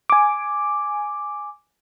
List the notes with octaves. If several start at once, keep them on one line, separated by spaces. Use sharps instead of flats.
G#5 D6